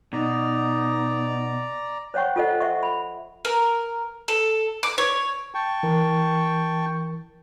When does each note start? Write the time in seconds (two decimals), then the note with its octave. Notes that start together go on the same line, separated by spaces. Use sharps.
0.13 B2 D#4 D5 A#5
2.14 C5 C#5 F#5 G5 C#6
2.36 F4 A4 C5 D#5 F#5
2.60 C5 E5 F#5 C#6
2.83 B5
3.45 A#4
4.28 A4
4.83 D6
4.98 C#5
5.55 G5 A5 C#6
5.83 E3 A#4